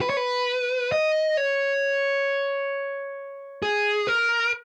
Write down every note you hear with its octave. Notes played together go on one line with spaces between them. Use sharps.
B4
C#5
B4
D#5
C#5
G#4
A#4